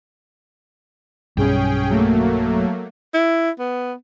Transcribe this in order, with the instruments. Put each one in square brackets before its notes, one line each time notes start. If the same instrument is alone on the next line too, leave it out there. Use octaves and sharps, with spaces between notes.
[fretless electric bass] B1 G2 [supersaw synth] C#4 G#4 G5
[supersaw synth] F#3 A3 A#3
[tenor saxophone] E4
B3